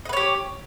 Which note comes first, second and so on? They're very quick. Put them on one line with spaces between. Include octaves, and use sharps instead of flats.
D#5 B4 C#5 G4